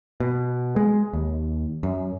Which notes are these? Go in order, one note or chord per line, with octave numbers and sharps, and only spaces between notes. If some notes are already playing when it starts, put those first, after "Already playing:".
B2
G#3
D#2
F#2